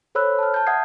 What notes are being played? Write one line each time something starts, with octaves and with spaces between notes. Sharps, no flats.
A4 C5 C#5 B5 E6 F#6
A5 F6
A5 G6
E5 F#5 D#6 G#6 C7